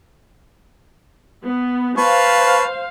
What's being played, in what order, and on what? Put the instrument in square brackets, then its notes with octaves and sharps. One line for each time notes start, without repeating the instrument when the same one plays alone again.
[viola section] B3
[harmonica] B4 A5 C#6 [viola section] C5 F5